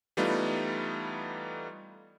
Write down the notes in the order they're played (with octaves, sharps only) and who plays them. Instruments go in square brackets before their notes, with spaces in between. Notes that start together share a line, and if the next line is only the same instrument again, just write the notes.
[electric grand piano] E3 G3 A3 B3 D#4 F4